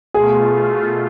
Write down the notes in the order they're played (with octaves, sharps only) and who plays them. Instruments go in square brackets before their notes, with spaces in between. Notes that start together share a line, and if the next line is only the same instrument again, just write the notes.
[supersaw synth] B2 A3 F4 [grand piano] G#4